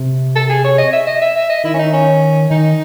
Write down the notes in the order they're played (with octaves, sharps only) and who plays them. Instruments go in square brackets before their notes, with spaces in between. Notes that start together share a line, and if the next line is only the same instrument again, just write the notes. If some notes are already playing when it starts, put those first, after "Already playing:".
Already playing: [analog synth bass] C3
[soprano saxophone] A4
G#4
C#5
D#5
E5
D#5
E5
E5
D#5
[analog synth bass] D#3 [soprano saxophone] E4
[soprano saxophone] C#4
D#4
C#4
[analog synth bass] D#3 [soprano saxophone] D#4